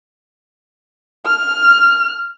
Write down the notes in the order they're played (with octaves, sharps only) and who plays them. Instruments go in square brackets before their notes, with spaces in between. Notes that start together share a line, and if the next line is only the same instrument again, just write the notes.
[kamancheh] F6